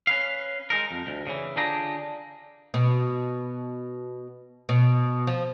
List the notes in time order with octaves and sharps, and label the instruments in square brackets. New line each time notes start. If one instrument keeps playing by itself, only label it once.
[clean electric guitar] C#4 B4 F5
G#3 D#4 A#4
F2
D2
C#3 E3
D3 D4 F4 G4 G#4 A#5
[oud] B2
B2
F3